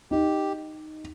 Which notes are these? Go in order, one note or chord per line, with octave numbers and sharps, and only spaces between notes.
D#4 G4